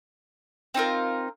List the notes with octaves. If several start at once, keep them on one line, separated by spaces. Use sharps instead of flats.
C4 D#4 F4 A#4